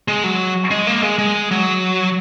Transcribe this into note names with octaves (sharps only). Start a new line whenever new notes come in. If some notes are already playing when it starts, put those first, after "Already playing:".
G#3
F#3
G#3
A#3
G#3
G#3
F#3